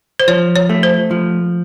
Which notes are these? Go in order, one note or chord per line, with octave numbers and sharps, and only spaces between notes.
C5
F3 C#5
C#5
A3
C5
F3